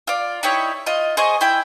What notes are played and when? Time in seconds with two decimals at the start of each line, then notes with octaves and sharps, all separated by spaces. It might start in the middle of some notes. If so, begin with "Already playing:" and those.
0.07 F4 D5
0.43 D#4 E4 G4 C#5
0.86 F4 D#5
1.17 G#4 C5 D#5 C#6
1.41 E4 G5